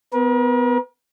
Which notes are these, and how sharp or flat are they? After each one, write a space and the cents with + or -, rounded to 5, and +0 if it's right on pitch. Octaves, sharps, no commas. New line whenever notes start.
B3 +20 A#4 +45